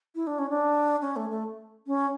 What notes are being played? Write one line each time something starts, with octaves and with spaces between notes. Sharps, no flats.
E4
D4
C#4
D4
C#4
A3
A3
C#4